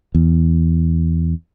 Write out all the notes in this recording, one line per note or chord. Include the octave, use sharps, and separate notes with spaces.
E2